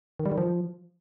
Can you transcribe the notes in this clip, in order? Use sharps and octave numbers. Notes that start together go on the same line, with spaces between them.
D#3
G3
D#3
F3